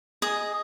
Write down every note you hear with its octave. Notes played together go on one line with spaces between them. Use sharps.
G#4 D#5